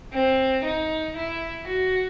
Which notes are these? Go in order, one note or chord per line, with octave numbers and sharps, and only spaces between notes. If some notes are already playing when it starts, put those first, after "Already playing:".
C4
D#4
E4
F#4